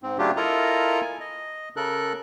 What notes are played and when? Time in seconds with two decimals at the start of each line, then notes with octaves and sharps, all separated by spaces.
0.03 G#2 C4
0.19 C#3 F#3 A3 D4 F4 G4
0.37 E4 F4 A4 A#4 D#5 A#5
1.01 G#5
1.20 D#5
1.76 C#3 A4 A#4 F#6